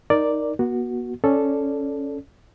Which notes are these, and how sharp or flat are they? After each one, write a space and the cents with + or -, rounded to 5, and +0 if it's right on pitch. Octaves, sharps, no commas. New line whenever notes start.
D#4 +0 A#4 +0 D5 +0
B3 -45 F#4 +0
C#4 +0 A4 -5 D5 +0